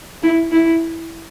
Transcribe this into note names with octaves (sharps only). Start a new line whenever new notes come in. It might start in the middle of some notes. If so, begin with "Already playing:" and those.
E4
E4